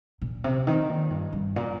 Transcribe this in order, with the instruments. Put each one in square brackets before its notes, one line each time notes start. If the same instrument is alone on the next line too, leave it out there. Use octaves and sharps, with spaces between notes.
[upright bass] A#2
C3
D#3
A#2
G2
G2
A#2